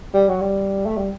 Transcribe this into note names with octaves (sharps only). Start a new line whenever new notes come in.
G3
F#3
G3
A3
G3